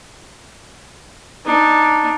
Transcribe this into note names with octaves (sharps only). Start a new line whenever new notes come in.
D4 D#4